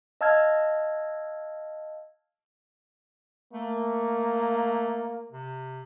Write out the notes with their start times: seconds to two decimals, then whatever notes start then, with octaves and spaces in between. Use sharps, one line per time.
0.21 D#5 F5 A5 E6 F6 G#6
3.53 A3 A#3
5.32 C3